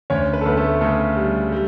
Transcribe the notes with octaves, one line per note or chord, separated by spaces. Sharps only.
D2 C#4 C#5
B4
A4
D2 B3 B4
A3 A4
C#3 A3 A4
G3
G3